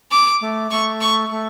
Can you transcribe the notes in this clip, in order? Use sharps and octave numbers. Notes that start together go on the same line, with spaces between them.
D6
A3
A3 C#6
C#6
A3